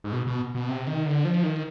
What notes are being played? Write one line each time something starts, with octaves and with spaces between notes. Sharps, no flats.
G#2
B2
B2
B2
C3
D#3
D3
F3
D#3